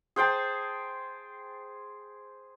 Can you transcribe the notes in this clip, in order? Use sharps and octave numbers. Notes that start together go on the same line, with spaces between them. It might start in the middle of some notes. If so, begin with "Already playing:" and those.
G#4 C5 G5 A5